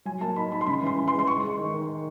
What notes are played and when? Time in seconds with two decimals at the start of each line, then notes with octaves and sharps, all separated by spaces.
0.05 F#3 G#5
0.21 A#3 A5
0.36 D#4 B5
0.52 D#4 B5
0.61 C6
0.67 C#3 B5
0.82 E3 C6
0.97 E3
1.08 C6
1.13 G#3
1.19 C6
1.27 G#3 C#6
1.43 G#3
1.58 D#3
1.74 D#3